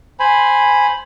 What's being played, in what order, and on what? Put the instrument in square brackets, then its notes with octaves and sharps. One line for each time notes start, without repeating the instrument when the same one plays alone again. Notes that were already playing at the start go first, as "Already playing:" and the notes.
[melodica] C5 G#5 B5